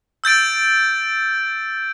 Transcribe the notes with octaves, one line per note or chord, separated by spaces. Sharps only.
E6 G6 A6 D7